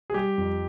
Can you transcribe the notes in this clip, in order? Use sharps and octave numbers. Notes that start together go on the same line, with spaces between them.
G#4
G3 G4
F2